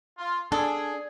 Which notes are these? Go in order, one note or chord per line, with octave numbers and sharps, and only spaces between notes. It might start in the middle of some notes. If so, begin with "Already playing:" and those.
F4
D4 G#4 A4